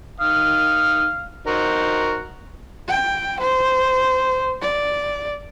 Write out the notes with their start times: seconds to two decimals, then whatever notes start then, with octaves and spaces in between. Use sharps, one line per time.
0.20 D#3 F5 D#6
1.47 D#4 F#4 A#4 C5
2.88 G5
3.40 C5
4.61 D5